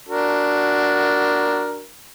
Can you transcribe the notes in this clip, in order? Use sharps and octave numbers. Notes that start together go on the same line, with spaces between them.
D4 F#4 A#4